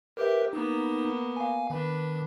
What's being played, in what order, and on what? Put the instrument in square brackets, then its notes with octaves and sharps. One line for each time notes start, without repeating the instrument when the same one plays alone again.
[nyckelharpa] G4 [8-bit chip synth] A#4 B4 E5
[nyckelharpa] A#3 B3 [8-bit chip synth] D#4
[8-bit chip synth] F5 G#5
[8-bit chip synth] D#3 [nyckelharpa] D4 B4